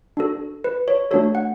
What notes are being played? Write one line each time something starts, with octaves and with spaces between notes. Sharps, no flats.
D4 F#4 A4
B4
C#5
A3 D4 F#4 A4 C#5
F#5